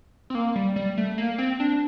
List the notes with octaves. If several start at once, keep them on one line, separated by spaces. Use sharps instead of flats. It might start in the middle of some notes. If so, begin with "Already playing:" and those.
C4
A#3
G3
G3
A3
A#3
C4
D4